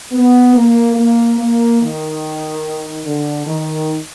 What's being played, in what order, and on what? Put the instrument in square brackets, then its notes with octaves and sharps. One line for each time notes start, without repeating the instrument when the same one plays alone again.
[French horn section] B3
A#3
A#3
A#3
D#3
D3
D#3